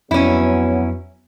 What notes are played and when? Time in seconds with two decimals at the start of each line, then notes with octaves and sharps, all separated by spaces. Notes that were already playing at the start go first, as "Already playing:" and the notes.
0.11 F2 F#3 B3 C#4 E4